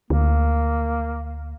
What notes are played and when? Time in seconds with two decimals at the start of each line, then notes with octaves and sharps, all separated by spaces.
0.10 D2 A#3